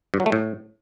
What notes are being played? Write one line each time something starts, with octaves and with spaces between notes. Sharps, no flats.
G2
F#3
A3
A2